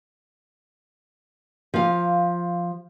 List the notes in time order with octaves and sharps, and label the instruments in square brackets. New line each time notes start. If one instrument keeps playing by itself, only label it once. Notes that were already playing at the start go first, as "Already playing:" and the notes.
[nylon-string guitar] F3 F5